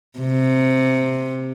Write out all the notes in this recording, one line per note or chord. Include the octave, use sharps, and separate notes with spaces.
C3